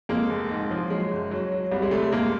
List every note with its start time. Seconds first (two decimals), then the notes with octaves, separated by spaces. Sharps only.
0.09 F2 G#3 A#3
0.30 F1
0.51 G#2
0.71 F3
0.90 F#3 G#3
1.11 F#1
1.31 F#3
1.52 F#3
1.72 C2 G3
1.82 G#3
1.91 C3 G3 A3
2.12 F#1 G#3 A#3